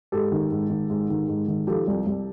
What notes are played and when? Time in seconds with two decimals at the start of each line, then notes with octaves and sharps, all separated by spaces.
0.12 G#2 G4 A4
0.32 D#3
0.51 G#2
0.70 D#3
0.90 G#2
1.10 D#3
1.28 G#2
1.48 D#3
1.67 F3 G4 A4
1.88 C2
2.07 C2